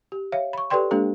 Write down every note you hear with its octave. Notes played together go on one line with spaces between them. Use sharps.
G4
C#5 E5 F5
B5 C#6
G4 A4 B4 D5 G5 C6
G#3 A#3 D4 G4 A4